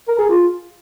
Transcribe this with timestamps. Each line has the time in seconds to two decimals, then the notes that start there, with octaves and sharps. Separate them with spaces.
0.08 A#4
0.19 G#4
0.29 F4